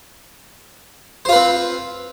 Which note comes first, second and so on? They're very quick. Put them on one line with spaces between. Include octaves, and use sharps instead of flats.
C5 F4 B4 C4